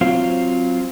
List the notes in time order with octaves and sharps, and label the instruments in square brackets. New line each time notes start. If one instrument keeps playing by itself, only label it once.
[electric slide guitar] F#3 C4 F4